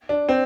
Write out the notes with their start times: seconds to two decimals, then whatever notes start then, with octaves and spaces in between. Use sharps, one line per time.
0.09 D4
0.29 C4